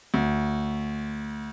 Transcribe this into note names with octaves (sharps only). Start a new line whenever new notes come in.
D2